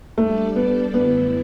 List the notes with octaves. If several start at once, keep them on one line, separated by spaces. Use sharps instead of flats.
G3 A3 D4 A4 D5
B3
F#2 D3 A3 B3 E4